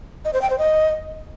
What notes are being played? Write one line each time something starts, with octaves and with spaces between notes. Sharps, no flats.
D#5
C5
G5
C5
D#5